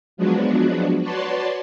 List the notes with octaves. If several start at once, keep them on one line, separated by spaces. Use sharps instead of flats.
F3 F#3 G#3 B3 D4 F#4
F#4 B4 C#5 D5 A5 C6